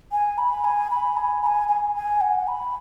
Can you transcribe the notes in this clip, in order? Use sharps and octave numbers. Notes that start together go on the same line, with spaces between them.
G#5
B5
G#5
B5
G#5
B5
G#5
G#5
G#5
F#5
B5